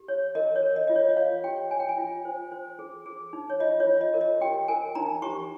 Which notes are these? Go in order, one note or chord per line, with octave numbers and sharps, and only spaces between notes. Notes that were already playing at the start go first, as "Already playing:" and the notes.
Already playing: G4
C#5
A#4 D#5
C#5
A#4
D#5
F4 D#5
C#5
D#5
C#5 F5
G4 G5
C#5 G#5
G5
G#5
F4
C5
C5
G#4
G#4
D#4
C#5
F4 D#5
C#5
F4
D#5
A#4
D#5
G4 G5
A#4 G#5
D#4 A#5
G4 C#6